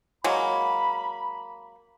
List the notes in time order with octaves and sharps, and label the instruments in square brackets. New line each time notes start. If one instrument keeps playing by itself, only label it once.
[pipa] F#3 G#3 A#3 [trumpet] B5